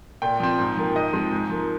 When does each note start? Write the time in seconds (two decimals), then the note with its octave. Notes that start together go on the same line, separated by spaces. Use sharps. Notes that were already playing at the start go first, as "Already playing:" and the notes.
0.22 A#2 G5
0.40 F3 C4
0.59 G#2
0.77 F3 A#3
0.96 G#2 D#5
1.13 F3 G#3 C4
1.32 G#2
1.50 F3 A#3